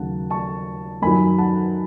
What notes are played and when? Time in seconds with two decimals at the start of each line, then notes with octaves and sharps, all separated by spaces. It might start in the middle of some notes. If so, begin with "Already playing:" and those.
Already playing: D#2 C#3 F#3 A3 F#5 A5
0.30 A5 C#6
1.02 F#2 D#3 F#3 G#5 B5
1.38 F#5 A5